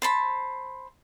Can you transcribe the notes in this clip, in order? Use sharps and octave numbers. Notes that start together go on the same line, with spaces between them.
C5 A5 B5